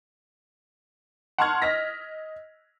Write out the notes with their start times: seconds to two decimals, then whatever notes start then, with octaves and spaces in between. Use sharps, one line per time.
1.38 F#5 A5 C6 C#6 F6 G#6
1.62 D#5 F6 A#6 B6